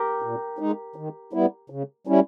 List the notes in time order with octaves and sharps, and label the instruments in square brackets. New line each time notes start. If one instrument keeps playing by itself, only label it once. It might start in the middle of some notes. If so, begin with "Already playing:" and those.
Already playing: [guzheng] G4 A#4
[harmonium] A#2
G#3 D#4
D#3
G3 B3 E4
C#3
G3 C#4 E4